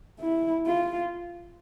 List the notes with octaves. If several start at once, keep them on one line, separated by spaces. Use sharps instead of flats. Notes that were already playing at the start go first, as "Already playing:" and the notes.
E4
F4